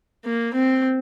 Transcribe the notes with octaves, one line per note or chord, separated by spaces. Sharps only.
A#3
C4